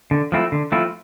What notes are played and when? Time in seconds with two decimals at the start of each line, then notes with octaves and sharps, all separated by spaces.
0.11 D3
0.32 F3 A3 C4 E4
0.52 D3
0.72 F3 A3 C4 E4